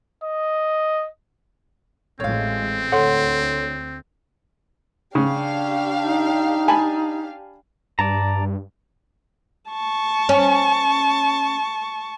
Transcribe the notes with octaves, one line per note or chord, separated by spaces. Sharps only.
D#5
A1 A2 G#3 C4 C#5 F5
D2 A4 C#5 F#5 C6
C#3 D4 G4 F5
D#4
G#5 A5 B5
G2 D5 A5 A#5
A5 C#6
C#4